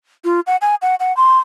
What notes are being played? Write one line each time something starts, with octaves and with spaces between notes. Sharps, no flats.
F4
F#5
G#5
F#5
F#5
C6